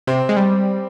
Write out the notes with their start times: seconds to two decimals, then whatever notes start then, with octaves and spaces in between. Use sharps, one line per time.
0.07 C3 C4
0.29 G#3
0.36 G3